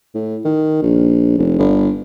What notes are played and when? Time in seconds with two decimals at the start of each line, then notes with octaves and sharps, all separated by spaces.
0.14 A2
0.45 D#3
0.82 A#1
1.38 F1
1.58 G1